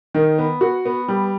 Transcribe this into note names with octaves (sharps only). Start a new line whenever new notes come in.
D#3
B3
F#4
B3
G3